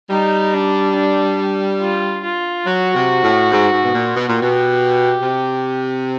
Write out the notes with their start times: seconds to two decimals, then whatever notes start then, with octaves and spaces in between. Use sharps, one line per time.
0.10 G3 D#4
0.54 D4
0.96 D4
1.80 F4
2.24 F4
2.66 F#3 F#4
2.94 C3
3.23 A2
3.52 G#2
3.72 G#2
3.83 B2
3.94 A#2
4.16 B2
4.29 A#2
4.37 G4
4.42 B2
5.22 C3